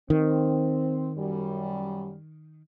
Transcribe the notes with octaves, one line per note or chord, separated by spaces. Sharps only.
D#3 C4
F#2 G3